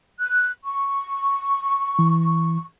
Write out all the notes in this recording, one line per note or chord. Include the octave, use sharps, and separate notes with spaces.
F#6
C#6
E3